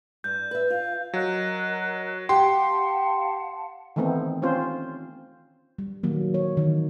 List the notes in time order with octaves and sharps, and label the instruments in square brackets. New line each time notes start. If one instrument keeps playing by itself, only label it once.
[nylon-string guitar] G2 [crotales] G6
[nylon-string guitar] B4 E5
[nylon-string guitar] F4 [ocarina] F5
[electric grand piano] F#3 [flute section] A#4 D#5 F#6
[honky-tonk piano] G4 [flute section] F5 F#5 A5 [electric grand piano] C6
[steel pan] D#3 E3 A3 B3 C4 D#4
C4 C#4 F4 C5
[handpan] G3
D#3 F#3 A#3
C#5
D#3 E3 D#4